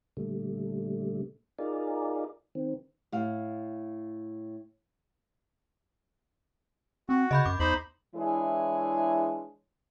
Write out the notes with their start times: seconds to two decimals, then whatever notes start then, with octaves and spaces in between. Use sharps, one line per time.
0.17 A#2 D3 G3 A3
1.59 D#4 F4 G#4 A#4 D5
2.55 D#3 C4
3.12 A2 F5
7.09 C4 F#4
7.31 C#3 D#5 B5 G6
7.46 F#2 D6
7.60 E2 D#4 C5 B5
8.15 E3 G#3 D4 E4 G#4 C#5